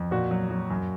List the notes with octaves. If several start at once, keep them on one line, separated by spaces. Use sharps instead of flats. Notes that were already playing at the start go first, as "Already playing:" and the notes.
Already playing: F2
A#2 F#4
F#3
F#3
F#2